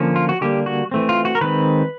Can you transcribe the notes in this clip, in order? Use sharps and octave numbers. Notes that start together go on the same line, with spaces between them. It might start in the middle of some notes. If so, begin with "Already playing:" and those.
Already playing: D3 F3 A#3 C#4
F4
F#4
D3 G3 A#3 G4
F#4
E3 A3 C4
F4
F#4
A#4
D#3 G#3 C4 B4